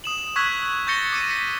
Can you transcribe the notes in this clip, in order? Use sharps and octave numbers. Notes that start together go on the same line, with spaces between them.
D#6 E7 F#7
C#6 E6 F#6 G#6 B6 F#7
C#6 G6 A6 A#6 C#7 G7
D6 C#7 D#7
B6